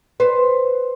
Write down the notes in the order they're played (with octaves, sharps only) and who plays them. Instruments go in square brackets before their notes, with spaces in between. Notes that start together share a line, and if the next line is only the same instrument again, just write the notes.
[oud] B4 C5